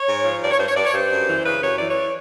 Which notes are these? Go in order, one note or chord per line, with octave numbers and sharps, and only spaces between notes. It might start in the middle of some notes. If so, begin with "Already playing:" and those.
Already playing: C#5
G#2
F3
G2 D5
C#5
G2 C5
C#5
G2 D5
C#5
G2 C5
F#2
E3
C#3 B4
F#2 C#5
E3 D5
C#5